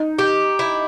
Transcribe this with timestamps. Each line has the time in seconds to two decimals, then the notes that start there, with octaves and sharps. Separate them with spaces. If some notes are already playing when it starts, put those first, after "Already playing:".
Already playing: D#4
0.19 G4
0.59 E4